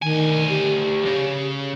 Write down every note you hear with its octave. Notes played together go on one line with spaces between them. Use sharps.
D2 D#3 G#5
G4
C#3